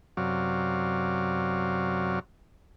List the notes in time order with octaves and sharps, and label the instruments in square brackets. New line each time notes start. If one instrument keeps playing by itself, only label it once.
[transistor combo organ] F#2 C3 F#3 D5 F5